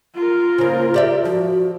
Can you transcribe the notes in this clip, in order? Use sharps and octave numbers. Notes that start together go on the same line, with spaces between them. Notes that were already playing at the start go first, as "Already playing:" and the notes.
F4 A#4
C#3 A#3 C5
G4 D5 E5
F3 F#4